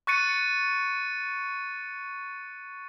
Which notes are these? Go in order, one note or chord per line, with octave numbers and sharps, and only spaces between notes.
C#6 F#6 A6 C#7 D#7